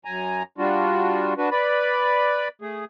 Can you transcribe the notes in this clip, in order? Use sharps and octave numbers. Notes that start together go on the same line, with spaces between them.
F#2 G#5 A#5
G3 D4 F4 F#4
D4 F#4 B4
B4 D5 B5
A3 G#4